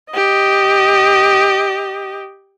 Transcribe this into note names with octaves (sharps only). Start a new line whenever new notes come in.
G4 D#5